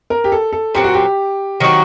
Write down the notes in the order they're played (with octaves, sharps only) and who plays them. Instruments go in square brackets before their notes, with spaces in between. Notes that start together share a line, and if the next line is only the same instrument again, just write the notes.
[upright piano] A#4
G4
A4
A4
[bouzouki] A#2 F#3 C4 [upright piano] G4
[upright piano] F#4
G4
[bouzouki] D#3 F#3 C4 F#4